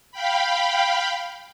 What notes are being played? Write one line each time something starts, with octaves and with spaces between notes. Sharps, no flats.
F5 G5 B5